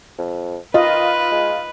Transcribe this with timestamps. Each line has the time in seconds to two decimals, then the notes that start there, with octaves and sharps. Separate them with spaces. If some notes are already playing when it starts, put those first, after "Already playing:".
0.18 F2
0.74 D#3 F4 B4 D#5
1.32 G#3